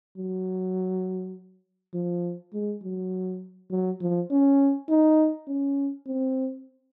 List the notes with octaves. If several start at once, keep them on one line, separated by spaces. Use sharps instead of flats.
F#3
F3
G#3
F#3
F#3
F3
C#4
D#4
C#4
C4